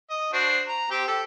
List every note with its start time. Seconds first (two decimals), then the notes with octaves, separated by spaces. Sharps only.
0.10 D#5
0.33 D4 F#4 C5
0.68 A#5
0.91 C4 G4 G5
1.08 G4 A4